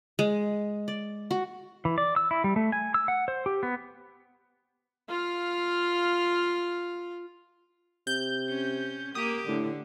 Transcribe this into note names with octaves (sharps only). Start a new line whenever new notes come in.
G#3
D5
F#4
E3
D5
E6
E4
G3
A3
G#5
E6
F#5
C5
G4
B3
F4 F5
C3 G6
C#4
A#3 G4 D#6
A2 D3